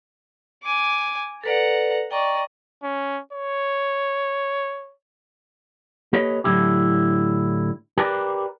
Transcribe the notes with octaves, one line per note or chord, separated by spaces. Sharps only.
G#5 D6
A4 B4 D5 F#5 A#5
D5 D#5 G5 A#5 C#6
C#4
C#5
A#3 G4 A4 B4 C#5 D#5
A2 D3 F#3 E4 G4
G4 A#4 B4 D5